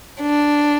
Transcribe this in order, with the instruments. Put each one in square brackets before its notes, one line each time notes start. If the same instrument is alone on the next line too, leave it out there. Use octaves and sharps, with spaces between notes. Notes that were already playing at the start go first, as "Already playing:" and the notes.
[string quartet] D4